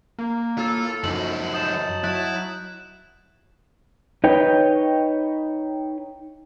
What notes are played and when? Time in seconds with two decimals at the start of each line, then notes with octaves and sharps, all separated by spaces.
0.19 A#3
0.58 A2 F4 A4
1.04 F#2 F3 D#4 F#7
1.54 C#5 D#5 A5 D#6 G6 E7
2.04 F#3 E4 F#6
4.24 D#4 B4 C#5 D#5 G5